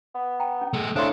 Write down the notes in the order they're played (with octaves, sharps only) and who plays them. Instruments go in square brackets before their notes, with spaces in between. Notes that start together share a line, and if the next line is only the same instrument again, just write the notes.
[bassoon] B3
[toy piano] G5 A#5
C#4
[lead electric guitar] A3 G#4
[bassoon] C#3 [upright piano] A3 E4 C6 [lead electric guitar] D4 [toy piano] C5